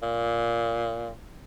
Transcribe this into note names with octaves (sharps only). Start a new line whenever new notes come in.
A#2